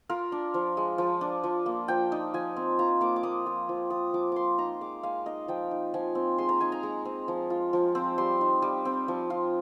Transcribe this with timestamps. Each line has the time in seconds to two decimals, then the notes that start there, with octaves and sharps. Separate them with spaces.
0.09 F4 A#4
0.32 D4
0.54 F3
0.77 G#3
0.98 F3
1.21 D4
1.44 F3
1.66 A#3
1.88 F3 G5
2.12 D#4
2.34 F3 G#5
2.56 C4
2.79 F4 A#5
3.01 A#3 D6
3.16 D6
3.23 A#3 D#6
3.46 F4 D#6
3.69 F3
3.90 F4 D#6
4.13 F3 D6
4.32 A#3 C6 D6
4.58 D#4 A#5
4.81 G#3 D6
5.03 G#3 F5
5.26 D#4 D#5
5.48 F3 G5
5.71 D#4
5.94 F3 G#5
6.15 C4
6.38 G#3 C6
6.49 A#5
6.61 D#4 G#5
6.72 A#5
6.83 G#3
7.05 C4
7.28 F3
7.50 F4
7.73 F3
7.95 C4
8.18 G3 C6
8.41 D#4
8.62 G3
8.85 C4
9.08 F3
9.30 F4